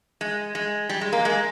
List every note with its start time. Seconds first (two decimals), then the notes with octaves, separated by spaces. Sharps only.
0.21 G#3
0.55 G#3
0.89 G3
1.01 G#3
1.13 A#3
1.25 G#3